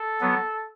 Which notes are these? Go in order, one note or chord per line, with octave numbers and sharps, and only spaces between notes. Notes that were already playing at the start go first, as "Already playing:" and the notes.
Already playing: A4
F#3 B3